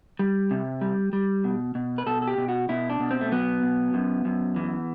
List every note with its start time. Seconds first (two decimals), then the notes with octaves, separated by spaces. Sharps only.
0.19 G3
0.51 C3
0.81 G3
1.13 G3
1.44 B2
1.75 B2
1.98 B4
2.06 B2 A4
2.22 A4
2.27 G4
2.38 B2
2.48 F#4
2.69 B2 E4
2.90 D4
3.00 B2
3.11 C4
3.21 A3
3.31 F#3 B3
3.63 B2
3.94 F#2
4.25 F#2
4.56 E3